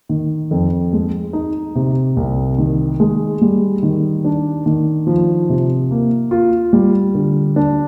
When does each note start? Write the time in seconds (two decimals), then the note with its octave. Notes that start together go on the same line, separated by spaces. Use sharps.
0.09 D#3
0.51 F2
0.93 G#3
1.33 D#4
1.75 C3
2.17 C2
2.58 D#3
3.00 G#3
3.41 G3
3.83 D#3
4.24 D4
4.66 D#3
5.07 F3
5.49 C3
5.91 A#3
6.31 F4
6.73 G3
7.15 D3
7.56 D4